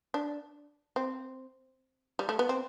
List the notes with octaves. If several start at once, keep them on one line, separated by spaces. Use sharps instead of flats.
D4
C4
G3
A3
B3
C4